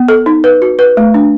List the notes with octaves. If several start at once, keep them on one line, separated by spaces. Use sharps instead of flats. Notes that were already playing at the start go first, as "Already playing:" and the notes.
Already playing: B3
A4
D#4
B4
F#4
B4
A3
D4